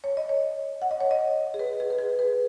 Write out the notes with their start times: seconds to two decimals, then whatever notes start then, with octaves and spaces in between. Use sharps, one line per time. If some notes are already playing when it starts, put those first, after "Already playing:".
0.04 C#5
0.17 D#5
0.29 C#5
0.82 F#5
0.91 D#5
1.01 C#5
1.11 D#5
1.54 G#4
1.59 B4
1.80 G#4
1.90 B4
1.99 G#4
2.19 B4